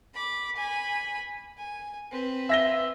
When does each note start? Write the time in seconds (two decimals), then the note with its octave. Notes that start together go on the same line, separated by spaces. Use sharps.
0.14 B5 D6
0.56 G#5 B5
1.57 G#5
2.11 C4 B4
2.49 E5 A#6 G7